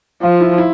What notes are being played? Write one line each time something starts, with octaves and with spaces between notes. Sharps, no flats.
F3 F4
E4
E4